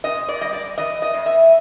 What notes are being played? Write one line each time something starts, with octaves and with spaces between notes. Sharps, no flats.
C3 D#5
D5
G3 D#5
D5
E3 D#5
D#5
F2
E5